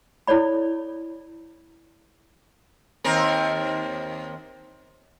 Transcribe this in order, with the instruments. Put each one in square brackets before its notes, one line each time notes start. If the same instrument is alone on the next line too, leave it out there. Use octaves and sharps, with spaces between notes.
[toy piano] E4 A4 C#5 D5 B5
[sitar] D#2 C4 A#4